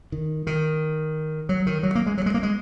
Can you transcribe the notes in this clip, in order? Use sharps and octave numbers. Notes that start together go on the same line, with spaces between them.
D#3
D#3
F#3
D#3
F#3
A#3
G#3
F#3
G#3
A#3
G#3